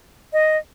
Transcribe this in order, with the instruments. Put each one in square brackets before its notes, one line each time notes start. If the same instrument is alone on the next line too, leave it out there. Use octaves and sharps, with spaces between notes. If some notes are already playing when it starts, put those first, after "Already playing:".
[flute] D#5